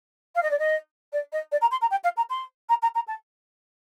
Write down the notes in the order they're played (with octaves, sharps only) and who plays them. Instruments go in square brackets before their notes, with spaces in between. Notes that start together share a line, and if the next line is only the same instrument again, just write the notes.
[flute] F5
D#5
D5
D#5
D5
D#5
D5
A#5
C6
A#5
G5
F5
A#5
C6
A#5
A#5
A#5
A5